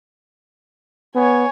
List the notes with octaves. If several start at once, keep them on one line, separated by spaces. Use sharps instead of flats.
B3 C#5 G#5